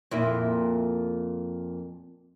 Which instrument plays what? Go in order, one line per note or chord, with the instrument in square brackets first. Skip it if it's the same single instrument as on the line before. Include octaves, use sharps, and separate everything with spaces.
[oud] F2 A#2 E4